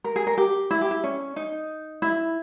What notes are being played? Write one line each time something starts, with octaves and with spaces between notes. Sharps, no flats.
A#4
G#4
A#4
G4
E4
G4
E4
C#4
D#4
E4